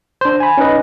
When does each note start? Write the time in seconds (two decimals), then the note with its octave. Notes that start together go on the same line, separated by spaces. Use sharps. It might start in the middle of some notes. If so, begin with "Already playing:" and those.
0.21 D4 C5
0.40 G#5 B5
0.58 C#4 D#4 B4 D#5